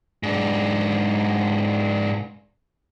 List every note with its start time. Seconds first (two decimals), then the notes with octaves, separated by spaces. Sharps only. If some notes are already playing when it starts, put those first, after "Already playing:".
0.23 G#2 D4